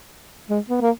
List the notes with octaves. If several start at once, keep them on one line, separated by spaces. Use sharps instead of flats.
G#3
B3
A#3